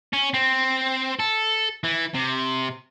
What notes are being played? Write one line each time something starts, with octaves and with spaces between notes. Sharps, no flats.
C#4
C4
A4
E3
C3